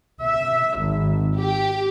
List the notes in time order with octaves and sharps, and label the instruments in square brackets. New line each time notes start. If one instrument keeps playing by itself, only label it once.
[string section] E5
G#1
G4